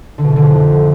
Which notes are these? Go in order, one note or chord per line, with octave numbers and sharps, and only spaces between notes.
D3
B2
E3
D3
F2